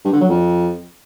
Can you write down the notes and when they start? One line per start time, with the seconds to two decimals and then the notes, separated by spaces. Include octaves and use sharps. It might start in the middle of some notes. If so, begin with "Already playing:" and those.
0.05 G2
0.13 D3
0.21 F#3
0.29 F2